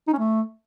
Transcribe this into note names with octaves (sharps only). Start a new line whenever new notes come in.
D#4
C#4
A3